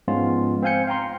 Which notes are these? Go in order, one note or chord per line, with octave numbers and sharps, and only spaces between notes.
G#2 F3 G#3 B3 C#4 F4
C4 C5 F5 G#5 G6 C#7
F5 G5 A#5 C6